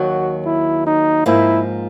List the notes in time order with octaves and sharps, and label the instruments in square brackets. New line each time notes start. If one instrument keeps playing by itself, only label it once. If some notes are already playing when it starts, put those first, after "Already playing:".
Already playing: [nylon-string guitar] D#2 D#3 F#3 [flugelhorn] F#4
[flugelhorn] E4
D#4
[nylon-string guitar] G#2 F3 A#3 [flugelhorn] E4